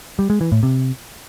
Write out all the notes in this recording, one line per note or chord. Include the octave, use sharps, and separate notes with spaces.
G3
G#3
E3
A2
C3